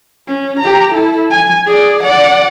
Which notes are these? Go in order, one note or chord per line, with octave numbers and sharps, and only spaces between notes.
C#4
G4 A#5
E4 A4
G#5
G#4 D5
D5 F#5